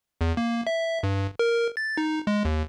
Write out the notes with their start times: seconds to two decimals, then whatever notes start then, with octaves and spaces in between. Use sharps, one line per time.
0.21 E2
0.37 A#3
0.67 E5
1.03 G2
1.39 A#4
1.77 A6
1.97 D#4
2.27 G#3
2.45 D#2